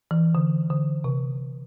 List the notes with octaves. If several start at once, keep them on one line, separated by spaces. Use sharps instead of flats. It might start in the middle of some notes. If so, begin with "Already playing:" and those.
E3
D3
D3
C3